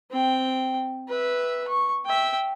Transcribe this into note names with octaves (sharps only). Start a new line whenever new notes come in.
C4 G5
B4 E5
C#6
E5 G5